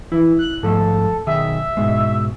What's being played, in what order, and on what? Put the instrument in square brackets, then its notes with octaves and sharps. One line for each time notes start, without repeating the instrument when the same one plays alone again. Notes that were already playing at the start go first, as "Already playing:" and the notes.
[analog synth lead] E3 [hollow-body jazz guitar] E4
[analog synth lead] F#6
[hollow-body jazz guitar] G#2 F3 A3 [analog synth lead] A4
[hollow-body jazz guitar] B1 D#3 G#4 [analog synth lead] E5
[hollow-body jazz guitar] G#2 B2 G#3